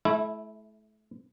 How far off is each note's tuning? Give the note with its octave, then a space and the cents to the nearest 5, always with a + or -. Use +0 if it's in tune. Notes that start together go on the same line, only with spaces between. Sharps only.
A3 -35 E4 -5